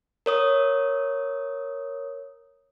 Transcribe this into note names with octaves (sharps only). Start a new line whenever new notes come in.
A#4 C#5 D#6